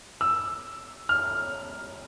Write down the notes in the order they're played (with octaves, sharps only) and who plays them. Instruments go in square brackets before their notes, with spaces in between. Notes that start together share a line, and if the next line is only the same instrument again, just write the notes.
[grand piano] E6
F6